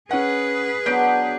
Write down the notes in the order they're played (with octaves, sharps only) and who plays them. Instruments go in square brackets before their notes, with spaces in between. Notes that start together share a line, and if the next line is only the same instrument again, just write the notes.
[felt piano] C#4 F#5 [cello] G#4 B4
[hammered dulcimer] F#3 D4 [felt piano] B3 G6 D7